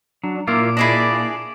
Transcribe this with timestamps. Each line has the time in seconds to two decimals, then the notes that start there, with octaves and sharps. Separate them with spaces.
0.23 F#3 D4
0.47 A#2 A#3 E4 F4 C#6 D6 D7
0.77 D4 E4 G#4 D5 D#5